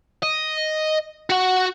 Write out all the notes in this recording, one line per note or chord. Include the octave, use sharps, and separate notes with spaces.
D#5
F#4 F#5